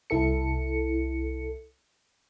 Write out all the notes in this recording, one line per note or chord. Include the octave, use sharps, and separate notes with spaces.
C2 E4 A4 C#7